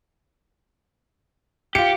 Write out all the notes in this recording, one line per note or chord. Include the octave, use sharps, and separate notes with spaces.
F4 G4 C#7